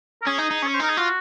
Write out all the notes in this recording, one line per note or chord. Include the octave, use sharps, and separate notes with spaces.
A#4
C#4 G#4
D#4
D#4
C#4 C#5
C5
D#4 A#4
G#4
F4 F#4